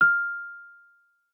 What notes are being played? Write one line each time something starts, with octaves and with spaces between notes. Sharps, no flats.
F6